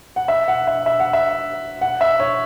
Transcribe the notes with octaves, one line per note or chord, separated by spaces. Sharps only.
F#5
E5
F#5
E5
E5
F#5
E5
F#5
E5
C#5